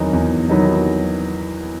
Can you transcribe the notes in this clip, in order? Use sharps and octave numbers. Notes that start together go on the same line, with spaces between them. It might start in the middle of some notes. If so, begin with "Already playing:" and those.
Already playing: E2 D#3 F#3 B3 D#4
E2
D#3 F#3 B3 D#4